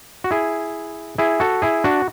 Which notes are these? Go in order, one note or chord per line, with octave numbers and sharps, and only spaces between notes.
F#4
E4 G#4
E4 G#4
F#4 A4
E4 G#4
D4 F#4